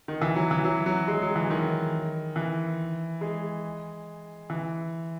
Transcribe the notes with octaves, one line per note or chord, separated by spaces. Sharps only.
D#3
E3
F#3
E3
F#3
F#3
G#3
F#3
E3
D#3
E3
G#3
E3